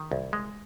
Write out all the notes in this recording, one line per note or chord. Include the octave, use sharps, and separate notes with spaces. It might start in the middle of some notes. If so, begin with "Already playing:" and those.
Already playing: D#3
C2
G#3